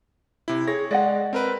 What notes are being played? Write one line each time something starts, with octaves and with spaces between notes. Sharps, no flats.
C3 E4
G#4 C#5 A#6
G#3 D5 D#5 F#5
C4 A#4 B4